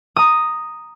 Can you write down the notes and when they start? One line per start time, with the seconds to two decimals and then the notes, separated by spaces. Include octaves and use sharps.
0.16 A#5 D#6